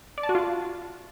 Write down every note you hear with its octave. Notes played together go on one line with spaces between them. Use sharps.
D5
A5
F#4
F4